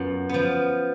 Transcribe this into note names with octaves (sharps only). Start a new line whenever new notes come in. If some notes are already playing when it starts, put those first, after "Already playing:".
Already playing: F#2 B3 F4
F3 B3